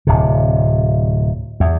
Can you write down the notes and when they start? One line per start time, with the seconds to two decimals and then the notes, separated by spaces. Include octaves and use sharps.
0.07 D1 C3
1.60 E2